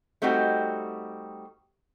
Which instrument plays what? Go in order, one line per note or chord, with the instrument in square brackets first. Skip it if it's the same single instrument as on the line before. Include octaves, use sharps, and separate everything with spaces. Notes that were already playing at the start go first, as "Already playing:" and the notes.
[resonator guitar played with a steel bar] G3 A3 C4 D#4 F#4 G4